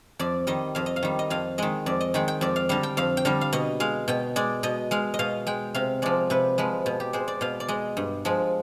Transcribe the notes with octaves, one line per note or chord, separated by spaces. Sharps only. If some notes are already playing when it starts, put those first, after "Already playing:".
F2 D5
D#3 G3 D#5
F2 F5
D#5
F5
D#3 G3
D#5
F2 F5
D#3 G#3 D#5
F2 D5
D#5
D#3 G#3 G5
G5
F2 D5
F5
D3 G3 F5
G5
F2 F5
G5
D3 G3 F5
F5
B2 D#5
G#3 F5
B2 G5
G#3 D5
B2 D#5
G#3 F5
D#5
B2 F5
G#3 G5
C3 F5
F3 G#3 D5
C3 B4
F3 G#3 B4
B2
G4
G#3 C5
D5
B2 F5
D5
G#3 D#5
G2
F3 G#3